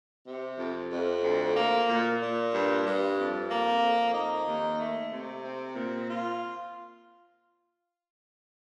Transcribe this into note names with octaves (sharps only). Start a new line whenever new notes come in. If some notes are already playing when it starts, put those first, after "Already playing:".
C3
F2
F2
D2
A#3
A#2
A#2
G2
G2
F2
A#3
F2
D#4
D#2
A3
C3
C4
A#2
F4